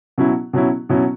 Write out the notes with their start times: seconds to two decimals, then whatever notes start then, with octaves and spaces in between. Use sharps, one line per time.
0.18 B2 F#3 C#4 E4
0.53 B2 F#3 C#4 E4
0.89 B2 F#3 C#4 E4